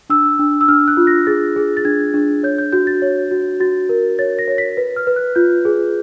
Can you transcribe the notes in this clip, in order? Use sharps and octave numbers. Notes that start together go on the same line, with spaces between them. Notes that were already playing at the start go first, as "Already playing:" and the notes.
D4 E6
D4
E6
D4 F6
F#6
F4
A#6
G#4 A6
G#4
A6
D4 G#6
D4
C#5 G6
G6
F#4 G6
A6
C#5
F#4
F#4 A6
A#4
C#5 A6
A#6
C#5
B6
B4
F6
B4
F#6
F4 G6
G#4